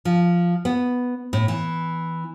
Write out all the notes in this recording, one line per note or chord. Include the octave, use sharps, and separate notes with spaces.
F3
B3
A2
E3